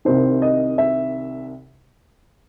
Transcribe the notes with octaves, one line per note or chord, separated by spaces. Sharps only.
C2 C3 D#3 C5
D#5
E5